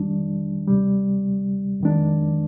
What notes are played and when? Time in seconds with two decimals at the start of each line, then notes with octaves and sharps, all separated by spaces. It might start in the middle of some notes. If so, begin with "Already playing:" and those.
Already playing: F2 D#3 G3 D4
0.67 D2 C3 G3
1.80 F2 D#3 G#3 D4